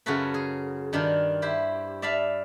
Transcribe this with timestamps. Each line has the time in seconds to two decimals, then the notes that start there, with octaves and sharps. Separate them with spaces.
0.06 F#2 C#3 F4 F#4 A4 B4
0.34 G#4
0.93 G2 D#3 D4 F4
1.42 E4 G4 C5
2.02 D5 E5 F5 A5 B5